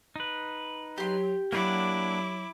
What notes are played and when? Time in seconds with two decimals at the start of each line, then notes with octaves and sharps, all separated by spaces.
0.16 D#4 B4
0.98 F#3 G4 C6
1.52 F#3 A#3 D4 E4 F#5 D6